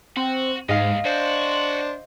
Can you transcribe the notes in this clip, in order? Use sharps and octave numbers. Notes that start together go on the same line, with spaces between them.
C4 F#4
D#2 G#2 D#5 F5
D4 F#4 C5